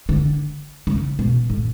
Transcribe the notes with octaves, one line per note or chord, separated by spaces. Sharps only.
D3
C#3
B2
A2